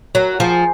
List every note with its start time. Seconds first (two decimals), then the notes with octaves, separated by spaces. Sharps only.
0.15 F#3 F#4 A#4
0.34 F#4
0.40 F3 F4 G#4